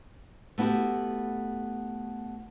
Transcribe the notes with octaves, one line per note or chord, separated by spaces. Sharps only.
A3 B3 E4 F#4 G4